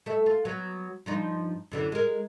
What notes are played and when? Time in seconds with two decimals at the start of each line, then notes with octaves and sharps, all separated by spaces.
0.06 A3 E5
0.26 F4
0.45 F#3 B3
1.06 G2 F3 D#4
1.71 F#2 D3 E3
1.92 G#3 A#4